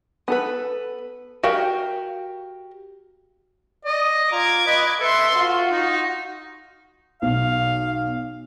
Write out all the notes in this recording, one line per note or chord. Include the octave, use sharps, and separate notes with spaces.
B3 A4 B4
F#4 G4 A#4 F5 G5
D5 D#5
F4 A#5 D6 G#6
B4 D#5
A4 B4 E5 C6
F4 F#4
D#4
B1 F5